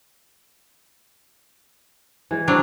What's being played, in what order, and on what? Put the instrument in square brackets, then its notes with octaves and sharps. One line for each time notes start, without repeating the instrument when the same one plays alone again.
[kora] E3 G#3
[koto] F#3 D4 [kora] C4 A#4